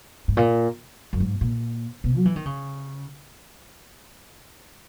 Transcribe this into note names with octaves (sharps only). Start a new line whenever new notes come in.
G#2
A#2
F#2
G#2
A#2
B2
F#3
E3
D#3
C#3